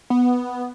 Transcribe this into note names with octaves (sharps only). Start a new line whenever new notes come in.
B3